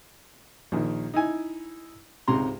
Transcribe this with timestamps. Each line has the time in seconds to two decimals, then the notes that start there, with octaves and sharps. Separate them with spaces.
0.72 A#1 D#3
1.14 D#4 E4 G#5
2.28 C#2 G#2 C3 A#5 C6